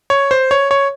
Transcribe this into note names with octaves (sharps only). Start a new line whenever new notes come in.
C#5
C5
C#5
C#5